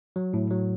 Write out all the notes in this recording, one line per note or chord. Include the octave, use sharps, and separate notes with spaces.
F#3
A2
F#3